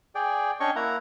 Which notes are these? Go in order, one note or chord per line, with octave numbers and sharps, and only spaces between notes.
G#4 D5 G5
C#4 D4 C#5 D#5 G5 C#6
A#3 E4 F#5 A#5